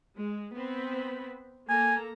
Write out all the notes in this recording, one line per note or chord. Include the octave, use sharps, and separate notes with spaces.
G#3
B3 C4 B5
A#3 A4 G#5 A#5